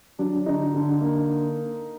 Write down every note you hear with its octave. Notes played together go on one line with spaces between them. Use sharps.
F#3 D4
D3 D#4
D3
A#3